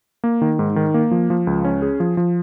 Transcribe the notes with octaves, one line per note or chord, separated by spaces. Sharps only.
A#3
D#3
G#2
D#3
A#3
F3
F3
C#2
C#4
G#4
F3
F3